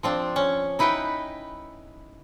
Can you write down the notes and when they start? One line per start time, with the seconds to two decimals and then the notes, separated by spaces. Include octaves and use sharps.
0.03 F3 C4 D4
0.36 C#4
0.79 D#4 E4 B4 F#5 G5